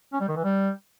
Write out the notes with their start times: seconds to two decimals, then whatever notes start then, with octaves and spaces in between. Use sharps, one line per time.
0.13 C#4
0.21 G3
0.28 D#3
0.36 E3
0.44 G3